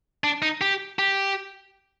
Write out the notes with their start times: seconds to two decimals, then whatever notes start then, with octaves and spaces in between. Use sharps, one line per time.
0.24 D4
0.42 D#4
0.61 G4
0.99 G4